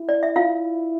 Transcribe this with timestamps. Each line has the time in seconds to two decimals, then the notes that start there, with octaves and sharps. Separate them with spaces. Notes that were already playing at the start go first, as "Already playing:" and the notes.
Already playing: E4
0.09 D5
0.23 E5
0.36 F4 F5